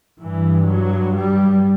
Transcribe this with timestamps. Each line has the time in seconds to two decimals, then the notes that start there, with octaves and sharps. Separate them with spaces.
0.22 G2 E3
0.70 F#3
1.16 G3